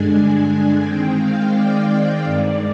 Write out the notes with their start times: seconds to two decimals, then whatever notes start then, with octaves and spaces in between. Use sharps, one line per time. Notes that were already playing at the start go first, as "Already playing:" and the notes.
Already playing: G2 D3 G#3 D4 G#5
0.81 D#3 G#3 C4 G5
1.17 F5
1.53 D5
2.25 G2 D#3 G#3